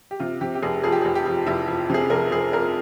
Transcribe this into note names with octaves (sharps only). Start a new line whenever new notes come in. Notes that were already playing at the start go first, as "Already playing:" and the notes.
G4
C3 F4
C3 G4
G4
F1 G#4
F2 G#4
G4
G#4
F1
G4
F2
F1 E4
F2
C3 G#4
F1 A#4
F1 G#4
F2 A#4